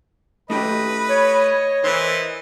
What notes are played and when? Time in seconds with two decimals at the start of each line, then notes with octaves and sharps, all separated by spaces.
0.50 A3 E4 G4 B4 D#5
1.09 C#5
1.84 E3 A#4 C5